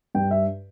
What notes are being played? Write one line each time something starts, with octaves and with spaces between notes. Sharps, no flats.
G2 G5
E5